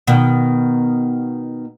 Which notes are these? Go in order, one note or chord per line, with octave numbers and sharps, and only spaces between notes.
B2 D#3